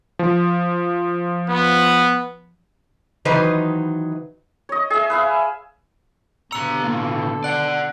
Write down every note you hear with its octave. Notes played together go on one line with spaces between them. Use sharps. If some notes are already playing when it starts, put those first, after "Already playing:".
F3
B3
D#3 E3 F#3 D#4 B4 C5
C#5 D#5
G#4 E5
B4 E5 F5
B2 D3 G4 A#5 E6 C#7
A2 A#3 A4
D5 F#5 F#6